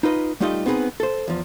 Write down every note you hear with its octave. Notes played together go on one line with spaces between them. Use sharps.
D#4 F4 B4 D#5
G3 A3 D#4 F4 G4 D#5
B3 C4 D#4 G#4 B4
A4 C5
E2 F3